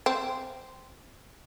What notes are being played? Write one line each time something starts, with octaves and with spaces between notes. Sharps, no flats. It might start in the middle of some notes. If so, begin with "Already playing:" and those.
C4